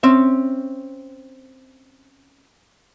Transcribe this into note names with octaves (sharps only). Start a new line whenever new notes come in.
C4 C#4 E5